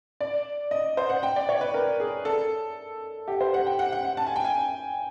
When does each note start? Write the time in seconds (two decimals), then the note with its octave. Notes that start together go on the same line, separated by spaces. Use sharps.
0.20 D5
0.71 D#5
0.97 C5
1.09 F#5
1.23 G5
1.36 D5
1.49 C#5
1.61 B4
1.74 A#4
2.00 G#4
2.25 A4
3.28 G4
3.41 C5
3.54 F#5
3.66 G5
3.79 F#5
3.92 F#5
4.05 F#5
4.17 A5
4.27 G#5
4.36 G5
4.45 G#5